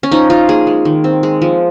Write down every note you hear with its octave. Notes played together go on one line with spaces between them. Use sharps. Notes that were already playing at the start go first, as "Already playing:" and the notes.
C#4
F3 D#4
C#4 F4
A#3 G#4
G#3
D#3
C4
G#3
F3